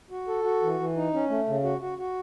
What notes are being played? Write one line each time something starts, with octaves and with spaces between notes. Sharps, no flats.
F#4
A4
F#4
E3
E3
D#4
C#4
A3
C#3
F#4
F#4
F#4